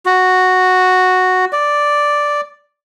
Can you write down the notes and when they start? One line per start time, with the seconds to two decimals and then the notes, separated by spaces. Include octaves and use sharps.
0.06 F#4
1.53 D5